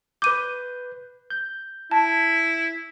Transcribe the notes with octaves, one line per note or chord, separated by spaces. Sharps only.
B4 D6 G6 D#7
G6
E4 A5